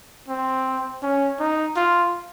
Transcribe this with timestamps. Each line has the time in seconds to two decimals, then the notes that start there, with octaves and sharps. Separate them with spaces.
0.28 C4
1.02 C#4
1.39 D#4
1.76 F4